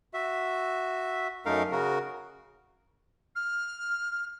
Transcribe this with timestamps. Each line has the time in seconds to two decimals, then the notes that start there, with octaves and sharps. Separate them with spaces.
0.14 F#4 E5
1.46 F#2 A3 D#4 A#4 F5
1.72 C#3 F#4 A#4
3.35 F6